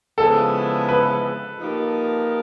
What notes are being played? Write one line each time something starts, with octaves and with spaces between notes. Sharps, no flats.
C#3 F3 G#3 B3 E4 A4
B4
F3 A#3 D#4 G4 A#4